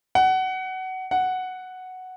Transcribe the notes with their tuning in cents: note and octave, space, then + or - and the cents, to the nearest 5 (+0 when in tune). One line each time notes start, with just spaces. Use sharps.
F#5 +20
F#5 +0